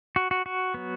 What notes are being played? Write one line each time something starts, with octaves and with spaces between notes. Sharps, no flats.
F#4
F#4
F#4
F#3 B3